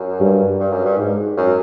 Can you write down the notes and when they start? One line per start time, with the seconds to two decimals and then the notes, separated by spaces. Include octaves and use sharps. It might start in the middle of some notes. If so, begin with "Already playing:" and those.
Already playing: F#2
0.20 G2
0.59 G2
0.72 F#2
0.85 G2
0.98 G#2
1.37 F#2